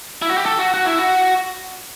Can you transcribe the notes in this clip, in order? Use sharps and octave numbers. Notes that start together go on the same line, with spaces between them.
E4
F#4
G4
A4
F#4
F#4
E4
F#4